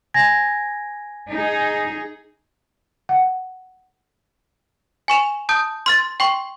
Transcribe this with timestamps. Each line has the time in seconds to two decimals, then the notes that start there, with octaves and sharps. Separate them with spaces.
0.14 G#5 G#6 A#6
1.32 D#4 G#4
3.09 F#5
5.08 G#5 C#6 E7 F7
5.49 A5 D#6 G6
5.86 C6 F6 A6
6.20 G5 C6 C#6